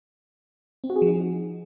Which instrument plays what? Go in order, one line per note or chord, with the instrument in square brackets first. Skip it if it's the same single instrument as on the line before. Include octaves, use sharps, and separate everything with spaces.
[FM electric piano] C4
F#4
G#4
F3
D#4